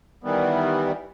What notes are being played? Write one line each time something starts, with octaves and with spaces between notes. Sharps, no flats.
D#3 E3 G3 B3